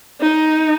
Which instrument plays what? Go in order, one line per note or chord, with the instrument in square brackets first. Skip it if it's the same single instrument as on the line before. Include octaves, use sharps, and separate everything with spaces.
[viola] D#4